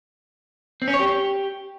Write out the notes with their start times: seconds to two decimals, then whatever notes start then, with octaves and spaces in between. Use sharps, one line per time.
0.82 C4
0.88 C#4
0.94 C#5
1.00 G4